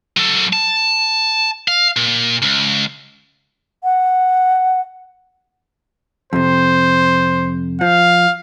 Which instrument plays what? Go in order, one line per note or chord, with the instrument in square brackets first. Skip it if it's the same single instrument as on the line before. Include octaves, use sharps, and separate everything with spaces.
[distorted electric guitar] F#3 A4
A5
F5
A#2
C#2
[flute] F#5
[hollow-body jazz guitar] F2 C3 [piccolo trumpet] C5
[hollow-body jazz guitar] F3 [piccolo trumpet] F5